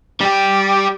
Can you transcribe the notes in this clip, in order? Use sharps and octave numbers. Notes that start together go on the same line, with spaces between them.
G3 G4